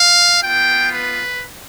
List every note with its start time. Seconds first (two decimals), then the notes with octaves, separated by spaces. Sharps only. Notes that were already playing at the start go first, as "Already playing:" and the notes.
Already playing: F5
0.42 B3 F4 G5
0.92 B4